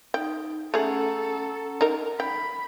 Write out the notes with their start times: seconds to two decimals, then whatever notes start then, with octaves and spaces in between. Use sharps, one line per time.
0.14 D#4 G5
0.74 A3 C#4 G#4 A4 F#5 A#5
1.81 D#4 A#4
2.20 G5 B5